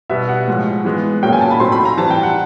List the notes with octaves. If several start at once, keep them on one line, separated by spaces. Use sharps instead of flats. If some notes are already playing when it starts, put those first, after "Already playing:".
B2 G3 B3 E5
F#5
A2 F3 G#3
E3 G#3 B3
A#2 F#3 A#3 C#4 G5
G#5
A5
B5
A2 F#3 A3 C4 C6
B5
A#5
E3 G3 C4 A5
G5
F#5